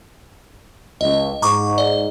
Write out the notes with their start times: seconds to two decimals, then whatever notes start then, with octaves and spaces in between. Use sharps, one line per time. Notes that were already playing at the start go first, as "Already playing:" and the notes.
1.01 C#2 D#5
1.42 G#2 A#5 C#6 D6
1.78 D5